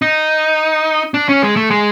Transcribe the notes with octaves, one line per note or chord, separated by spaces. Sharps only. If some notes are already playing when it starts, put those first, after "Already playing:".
D#4
D4
C#4
G#3
A3
G#3